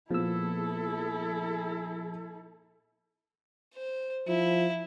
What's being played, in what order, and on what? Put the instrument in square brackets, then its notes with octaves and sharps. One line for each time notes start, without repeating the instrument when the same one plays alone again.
[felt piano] A#2 B3 [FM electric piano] F3 E6 [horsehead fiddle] E4 A4 [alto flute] G#4
[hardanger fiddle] C5
[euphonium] F3 [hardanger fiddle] E4